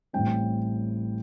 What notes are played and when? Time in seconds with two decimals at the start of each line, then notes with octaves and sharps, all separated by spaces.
0.13 A1 A2 G3 C4 G5